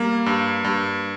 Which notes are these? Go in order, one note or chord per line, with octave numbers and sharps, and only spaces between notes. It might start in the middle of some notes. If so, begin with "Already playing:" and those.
Already playing: G3 A#3
G2
G2